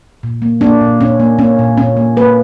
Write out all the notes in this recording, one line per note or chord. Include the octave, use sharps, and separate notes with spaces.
A#2
A#3
A#3 D4
A#2
A#2 C#4
A#3
A#3 C#4
A#2
A#2 C#4
A#3
A#3 B4